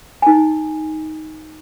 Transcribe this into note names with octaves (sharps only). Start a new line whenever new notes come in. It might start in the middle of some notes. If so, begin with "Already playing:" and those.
D#4 G#5